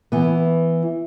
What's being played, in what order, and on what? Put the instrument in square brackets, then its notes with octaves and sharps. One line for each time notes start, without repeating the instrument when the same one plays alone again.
[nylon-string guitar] E3 B3